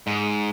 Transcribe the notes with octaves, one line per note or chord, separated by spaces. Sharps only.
G#2